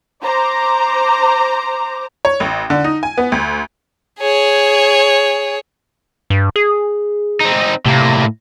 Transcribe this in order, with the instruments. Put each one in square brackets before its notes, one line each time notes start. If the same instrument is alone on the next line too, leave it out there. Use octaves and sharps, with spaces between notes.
[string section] C5 A#5 D6
[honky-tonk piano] C#5
A1
D3
D#4
G#5
B3
D2
[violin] G#4 C#5
[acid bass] G2
G#4
[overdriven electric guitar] C4 D#4
[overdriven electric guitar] A2 A#3 [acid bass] C3